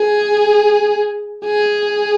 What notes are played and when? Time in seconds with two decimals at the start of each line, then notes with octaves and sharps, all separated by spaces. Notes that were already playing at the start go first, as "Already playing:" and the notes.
Already playing: G#4
1.45 G#4